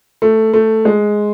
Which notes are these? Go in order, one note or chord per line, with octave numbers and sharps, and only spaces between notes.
A3
A3
G#3